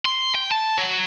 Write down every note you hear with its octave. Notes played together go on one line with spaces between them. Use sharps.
C6
G5
A5
F#3